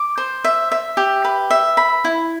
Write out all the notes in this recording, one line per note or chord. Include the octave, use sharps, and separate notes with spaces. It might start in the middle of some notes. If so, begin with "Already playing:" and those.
Already playing: D6
C5
E5
E5
G4
B4
E5
B5
E4